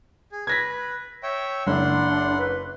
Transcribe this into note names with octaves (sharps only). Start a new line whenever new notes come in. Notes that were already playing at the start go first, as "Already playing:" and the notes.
G#4
B4 G#6 A#6 B6
C#5 E5 G5
F#1 D4 F#5 C6
B4